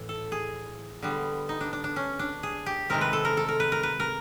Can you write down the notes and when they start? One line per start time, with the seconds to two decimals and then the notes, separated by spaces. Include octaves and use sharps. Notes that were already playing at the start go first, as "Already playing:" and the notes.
Already playing: A2 E3
0.09 A4
0.32 G#4
1.02 D3 G3 B3
1.49 D#4
1.61 D4
1.73 D4
1.84 D4
1.96 C#4
2.19 D4
2.43 G#4
2.66 G4
2.90 C3 D#3 G#3 C4 A#4
3.01 B4
3.13 A4
3.25 A#4
3.37 A4
3.49 A#4
3.60 B4
3.72 A#4
3.83 B4
4.00 A#4